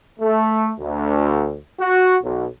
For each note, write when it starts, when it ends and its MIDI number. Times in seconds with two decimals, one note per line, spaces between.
0.20 0.71 57
0.79 1.57 38
1.80 2.16 66
2.23 2.46 35